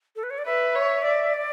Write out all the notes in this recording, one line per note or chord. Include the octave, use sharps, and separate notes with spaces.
A4
B4
C#5
D5
B4 E5
C#5
D5
D5